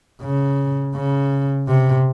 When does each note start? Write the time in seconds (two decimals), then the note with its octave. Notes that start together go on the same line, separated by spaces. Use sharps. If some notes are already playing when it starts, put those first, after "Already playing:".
0.21 C#3
0.95 C#3
1.68 C3